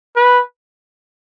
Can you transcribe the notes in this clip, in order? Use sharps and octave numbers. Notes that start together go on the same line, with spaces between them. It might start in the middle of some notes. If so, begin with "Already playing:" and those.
B4